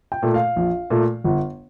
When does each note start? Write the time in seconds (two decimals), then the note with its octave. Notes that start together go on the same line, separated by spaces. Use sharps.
0.12 G5
0.23 A#2 A3
0.34 F5
0.56 A#1
0.90 A#2 A3
1.24 G1